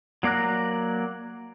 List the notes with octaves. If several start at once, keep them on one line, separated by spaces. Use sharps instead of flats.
F#3 A#3 D5 A#5 F#6